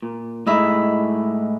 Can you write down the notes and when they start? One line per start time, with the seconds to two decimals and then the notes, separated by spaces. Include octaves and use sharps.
0.02 A#2
0.46 A2 G#3 D#4 E4 E5